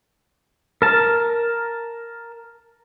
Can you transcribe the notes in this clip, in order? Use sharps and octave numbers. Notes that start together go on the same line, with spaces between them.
A#4 A5